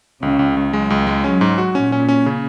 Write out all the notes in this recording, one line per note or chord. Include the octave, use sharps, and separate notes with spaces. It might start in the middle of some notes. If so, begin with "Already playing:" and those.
C#2 C#3
C#2
C#2
F#3 G#3
C#2
G#3
F#3 C#4
G#2
F#4
A#2 C#4
C#4
C#4
C#3